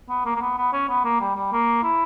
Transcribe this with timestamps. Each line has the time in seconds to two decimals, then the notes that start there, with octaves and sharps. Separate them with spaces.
0.09 B3
0.25 A#3
0.35 A#3
0.41 B3
0.58 B3
0.73 C#4
0.89 B3
1.05 A#3
1.20 G3
1.36 G3
1.52 A#3
1.83 E4